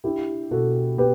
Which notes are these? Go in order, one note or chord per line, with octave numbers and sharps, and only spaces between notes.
D4 E4 G4
B2 F#4 A4
B3 G4 B4